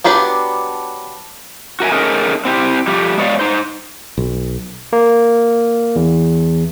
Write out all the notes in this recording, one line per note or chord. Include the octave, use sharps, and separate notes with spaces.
F#3 B3 D4 G4 B4
F#4 A#4 E5 G#5
A3 C#4 D#4 G#4 A#4
C4 E4 G4
F3 G3 A3 G4
G#3 B3 C#5 D5 F5
D#4 C5
B1
A#3
E2